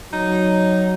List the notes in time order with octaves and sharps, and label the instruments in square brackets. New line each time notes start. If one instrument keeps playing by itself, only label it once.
[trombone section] F#3 [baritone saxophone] D#4